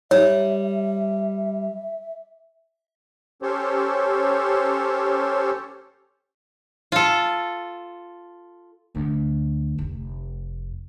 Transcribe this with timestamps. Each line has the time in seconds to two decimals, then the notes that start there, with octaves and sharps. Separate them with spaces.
0.11 G3 C#5 E5
3.42 C#4 G4 A4 C5 C#5
6.92 F4 A4
8.95 D2
9.78 F1 F2